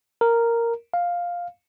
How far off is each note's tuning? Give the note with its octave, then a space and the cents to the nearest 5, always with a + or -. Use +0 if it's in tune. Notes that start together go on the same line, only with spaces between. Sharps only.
A#4 -5
F5 +5